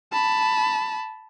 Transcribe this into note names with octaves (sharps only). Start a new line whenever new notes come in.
A5 B5